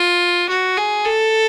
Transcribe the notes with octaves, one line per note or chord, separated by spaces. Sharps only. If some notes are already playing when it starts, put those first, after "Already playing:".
Already playing: F4
F#4
G#4
A4